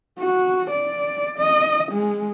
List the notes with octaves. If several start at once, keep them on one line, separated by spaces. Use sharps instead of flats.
F#4
D5
D#5
G#3